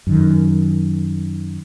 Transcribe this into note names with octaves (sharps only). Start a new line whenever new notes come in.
F#2 D#3